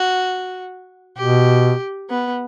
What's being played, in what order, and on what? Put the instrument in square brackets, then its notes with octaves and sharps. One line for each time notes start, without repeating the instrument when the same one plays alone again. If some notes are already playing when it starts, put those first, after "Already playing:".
Already playing: [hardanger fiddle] F#4
[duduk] B2 [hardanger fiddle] G4
[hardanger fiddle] B3